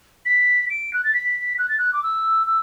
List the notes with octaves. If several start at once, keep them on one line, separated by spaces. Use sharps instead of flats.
B6
D7
F#6
A6
B6
F#6
A6
F#6
D6
E6
E6